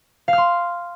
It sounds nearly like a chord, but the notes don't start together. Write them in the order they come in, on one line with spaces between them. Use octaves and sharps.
F5 F6 C6